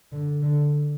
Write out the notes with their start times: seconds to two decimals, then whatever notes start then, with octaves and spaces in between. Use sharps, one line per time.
0.12 D3
0.42 D3